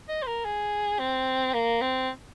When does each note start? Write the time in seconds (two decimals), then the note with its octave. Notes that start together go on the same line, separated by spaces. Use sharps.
0.09 D#5
0.22 C5
0.27 A#4
0.45 G#4
0.99 C4
1.53 A#3
1.81 C4